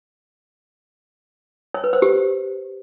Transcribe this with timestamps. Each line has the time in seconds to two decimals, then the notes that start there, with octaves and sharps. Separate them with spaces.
1.74 C#5
1.84 B4
1.93 C5
2.02 G4